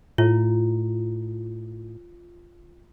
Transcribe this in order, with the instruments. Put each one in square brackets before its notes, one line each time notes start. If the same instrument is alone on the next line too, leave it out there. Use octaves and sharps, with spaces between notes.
[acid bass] A2 [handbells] F4